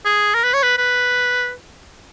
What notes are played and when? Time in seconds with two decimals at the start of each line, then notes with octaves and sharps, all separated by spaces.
0.05 G#4
0.34 A#4
0.44 B4
0.53 C#5
0.62 B4
0.78 B4